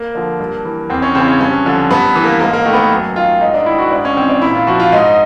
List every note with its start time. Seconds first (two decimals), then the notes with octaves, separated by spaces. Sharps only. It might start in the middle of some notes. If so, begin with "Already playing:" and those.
Already playing: A#3
0.15 D3 F3
0.40 G2
0.65 E3
0.90 E2 C4
1.02 C#4
1.15 C#3 E3 C4
1.28 C#4
1.40 G2 C#4
1.65 D3 F3
1.91 G2 B3
2.15 E3
2.24 A#3
2.40 G#2 A#3
2.53 A#3
2.66 D#3 A3
2.73 B3
2.79 A#3
2.91 F#2
3.16 D#3 F4
3.41 G#2 D#4
3.54 D4
3.66 D#3 E4
3.79 F#4
3.91 G#2 D4
4.05 C#4
4.17 E3 C4
4.30 D4
4.42 A#2 E4
4.55 F4
4.67 F3 F#4
4.80 F4
4.92 G#2 D#4